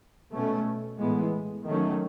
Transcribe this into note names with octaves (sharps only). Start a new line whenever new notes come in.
B2 A3 C#4
A2 E3 G#3 B3
D#3 F#3 A3 C#4